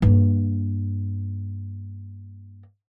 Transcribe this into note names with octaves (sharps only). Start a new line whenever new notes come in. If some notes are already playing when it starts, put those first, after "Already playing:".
G2 A#3